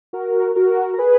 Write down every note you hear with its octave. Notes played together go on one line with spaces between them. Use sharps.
F#4 A#4
F#4 A#4
A#4
G#4 B4